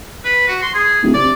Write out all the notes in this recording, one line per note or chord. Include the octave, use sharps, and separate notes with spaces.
B4
F#4
C6
G#4
D1
C3 D5